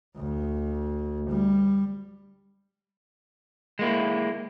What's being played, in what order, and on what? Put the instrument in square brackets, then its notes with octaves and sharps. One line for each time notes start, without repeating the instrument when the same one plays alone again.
[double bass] D2
G3
[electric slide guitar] G#3 A#3 E4